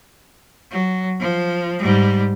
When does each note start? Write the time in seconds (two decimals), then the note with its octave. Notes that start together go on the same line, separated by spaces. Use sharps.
0.70 F#3
1.20 F3
1.79 G#2 G3